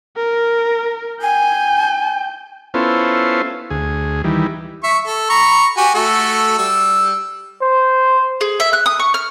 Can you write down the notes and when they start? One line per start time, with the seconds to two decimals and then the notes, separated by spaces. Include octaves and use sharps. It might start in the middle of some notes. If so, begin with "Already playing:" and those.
0.16 A#4
1.22 G5 G#5 G6
2.74 B3 C#4 E4 F4 A4 C5
3.70 D2 G#4
4.24 D#3 E3 G3
4.84 E5 C#6
5.06 A4
5.30 A#5 B5 C#6
5.77 F#4 G4 G#5
5.95 A3 F#4 A4
6.58 G3 E6
7.61 C5
8.41 G#4
8.60 E5
8.73 F#6
8.86 D#6
8.99 C#6
9.14 F6